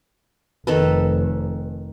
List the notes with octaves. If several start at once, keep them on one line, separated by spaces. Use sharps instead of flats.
F1 D#3 A4 B4